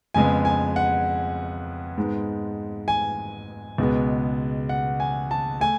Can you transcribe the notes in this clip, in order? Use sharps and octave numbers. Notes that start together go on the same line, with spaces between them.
F2 C#3 G#3 B3 G#5
G#5
F#5
G#2 G#3 B3
G#5
C#2 B2 G#3 B3
F#5
G#5
A5
A3 G#5